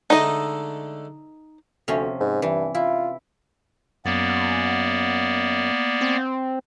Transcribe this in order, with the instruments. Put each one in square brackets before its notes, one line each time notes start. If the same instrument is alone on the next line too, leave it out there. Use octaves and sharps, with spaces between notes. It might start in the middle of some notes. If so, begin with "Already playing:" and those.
[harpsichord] D3 G#3 A3 [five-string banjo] D#4 D#5
[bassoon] D2 [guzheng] C3 F3 C#4
[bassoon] G#2
[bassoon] G2 [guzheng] E3
[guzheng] E4 [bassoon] F4
[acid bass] F#2 [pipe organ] A#3 B3 D5
[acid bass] C4